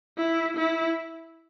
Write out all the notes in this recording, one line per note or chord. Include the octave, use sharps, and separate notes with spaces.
E4
E4